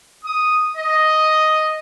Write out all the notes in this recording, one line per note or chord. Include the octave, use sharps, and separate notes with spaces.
D#6
D#5